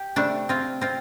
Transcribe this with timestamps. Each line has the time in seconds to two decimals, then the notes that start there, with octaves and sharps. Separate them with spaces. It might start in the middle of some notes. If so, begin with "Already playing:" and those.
Already playing: G4
0.16 C3 G3 A3 D4
0.49 C4 F4
0.81 C4 F4